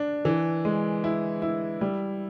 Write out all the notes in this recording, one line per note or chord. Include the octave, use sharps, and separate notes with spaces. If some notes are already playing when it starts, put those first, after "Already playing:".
Already playing: D4
E3
G#3
E4
E4
G3